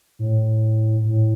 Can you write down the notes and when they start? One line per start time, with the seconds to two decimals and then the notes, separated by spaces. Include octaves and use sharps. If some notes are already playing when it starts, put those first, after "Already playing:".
0.19 A2
1.04 A2